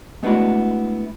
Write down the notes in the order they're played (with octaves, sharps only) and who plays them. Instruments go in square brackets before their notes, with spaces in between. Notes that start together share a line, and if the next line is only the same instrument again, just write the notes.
[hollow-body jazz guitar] G#3 A3 B3 D4 E4 F#4